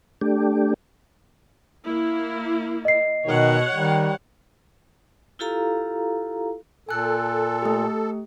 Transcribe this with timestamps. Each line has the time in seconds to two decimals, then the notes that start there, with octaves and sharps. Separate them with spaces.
0.21 A3 D4 G4
1.85 A#3 E4
2.85 D#5 C7
3.26 B2 D#3 C#5 F#5
3.75 D#3 G3
5.39 E4 F4 G4 A4 F5 A#5
6.89 A#2 A4 G#5 F#6
7.62 A3 G4